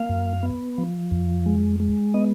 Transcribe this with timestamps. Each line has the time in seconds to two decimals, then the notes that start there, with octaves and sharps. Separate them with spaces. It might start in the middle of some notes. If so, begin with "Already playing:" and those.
Already playing: A#3 F5
0.09 F#2
0.43 B3
0.78 F3
1.11 F2
1.46 G#3
1.80 G#3
2.14 B3 D#5